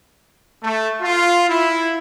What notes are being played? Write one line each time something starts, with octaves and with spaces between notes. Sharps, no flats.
A3
F4
E4